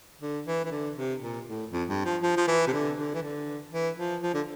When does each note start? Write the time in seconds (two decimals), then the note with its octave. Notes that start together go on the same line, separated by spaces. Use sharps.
0.22 D3
0.47 E3
0.65 E3
0.72 D3
0.97 C3
1.21 A#2
1.47 A2
1.72 F2
1.89 G2
2.05 F3
2.22 F3
2.37 F3
2.47 E3
2.67 C3
2.73 D3
2.97 D3
3.14 E3
3.23 D3
3.72 E3
3.98 F3
4.23 F3
4.34 D3